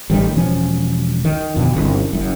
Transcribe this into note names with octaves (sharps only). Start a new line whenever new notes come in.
A1 D#3 G3 D4
E1 F3 C#4
D#3
F2 B2 D3
G1 C2 C#4
F#1 F#2